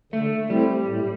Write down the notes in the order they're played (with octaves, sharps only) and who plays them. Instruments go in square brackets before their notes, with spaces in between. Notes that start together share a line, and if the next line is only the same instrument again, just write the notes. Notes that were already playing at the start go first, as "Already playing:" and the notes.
[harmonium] D3 [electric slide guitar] A3
[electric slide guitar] G3 [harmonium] A3 C4 E4
[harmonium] A2